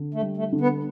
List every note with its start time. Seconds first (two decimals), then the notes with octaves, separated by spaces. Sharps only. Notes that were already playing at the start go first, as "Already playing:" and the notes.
Already playing: D3
0.15 A3
0.22 G3
0.37 A3
0.52 D3
0.61 B3